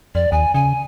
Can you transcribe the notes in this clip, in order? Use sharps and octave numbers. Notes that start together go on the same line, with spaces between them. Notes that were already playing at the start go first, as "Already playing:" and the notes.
F2 D5
D#2 G#5
C#3 G#5